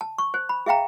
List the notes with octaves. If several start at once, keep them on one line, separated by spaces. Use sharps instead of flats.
A5
C#6
C5
B5
G#4 E5 F5 G5 A#5